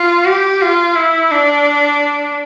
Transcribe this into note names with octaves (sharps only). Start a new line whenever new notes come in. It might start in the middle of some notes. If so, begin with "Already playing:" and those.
Already playing: F4
G4
F4
E4
D4